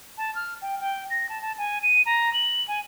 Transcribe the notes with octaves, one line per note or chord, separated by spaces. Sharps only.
A5
F6
G5
G5
A#6
A5
A5
G#5
D#7
A#5
F#7
G#5